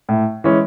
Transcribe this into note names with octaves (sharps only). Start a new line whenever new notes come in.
A2
E3 G#3 C#4